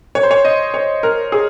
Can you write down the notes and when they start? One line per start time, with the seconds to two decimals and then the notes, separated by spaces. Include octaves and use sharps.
0.15 C#5
0.23 C5
0.31 C#5
0.45 D#5
0.74 C#5
1.03 A#4
1.32 G#4